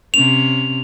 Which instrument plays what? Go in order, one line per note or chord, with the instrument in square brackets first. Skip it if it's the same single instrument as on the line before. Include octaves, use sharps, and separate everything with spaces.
[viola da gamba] C3 C#4 [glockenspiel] F7